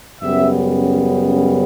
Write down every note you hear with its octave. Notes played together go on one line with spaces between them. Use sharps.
F#2 C#3 G3 B3 E5